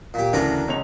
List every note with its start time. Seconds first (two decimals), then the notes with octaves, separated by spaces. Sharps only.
0.14 A#2 G4
0.33 D2 C#3 E3 D4 F#4 A#4
0.68 C#2 C#5 F7